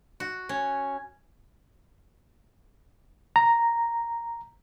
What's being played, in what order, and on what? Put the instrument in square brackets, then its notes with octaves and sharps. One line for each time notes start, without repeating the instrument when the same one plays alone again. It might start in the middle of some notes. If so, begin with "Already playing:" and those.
[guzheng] F#4
C#4
[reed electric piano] A#5